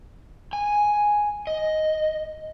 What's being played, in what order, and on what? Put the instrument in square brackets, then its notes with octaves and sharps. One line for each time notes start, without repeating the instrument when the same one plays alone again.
[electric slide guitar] G#5
D#5